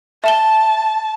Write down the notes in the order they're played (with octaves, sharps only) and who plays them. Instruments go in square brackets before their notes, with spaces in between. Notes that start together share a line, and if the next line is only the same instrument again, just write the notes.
[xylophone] E5 E7 G7 [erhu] A5